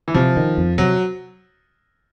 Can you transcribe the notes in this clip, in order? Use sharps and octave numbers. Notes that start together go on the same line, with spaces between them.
E3
C3 F3
D#3
F2
C3 F#3